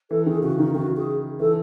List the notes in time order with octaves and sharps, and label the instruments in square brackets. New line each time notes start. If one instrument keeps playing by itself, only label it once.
[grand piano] E3 [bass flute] A4
[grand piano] D#3 [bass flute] G#4
[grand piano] C#3 [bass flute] F#4
[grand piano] D#3 [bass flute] D#4
[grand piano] D#3 [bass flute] F#4
[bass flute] G#4
[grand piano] E3 [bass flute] A4